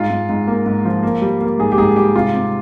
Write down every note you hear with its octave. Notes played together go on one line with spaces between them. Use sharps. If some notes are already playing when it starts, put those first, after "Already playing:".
Already playing: G#2 F4
G#2
G#2
A#3
G#2
F3
A#3
G3
A#3
G#2 G#4
G4
G#2 G#4
G3 G4
C3 F4
C3